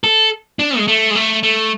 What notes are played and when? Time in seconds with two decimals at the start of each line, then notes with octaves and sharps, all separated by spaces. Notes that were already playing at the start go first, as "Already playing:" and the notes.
0.04 A4
0.59 D4
0.77 G#3
0.88 A3
1.10 G#3
1.15 A3
1.43 A3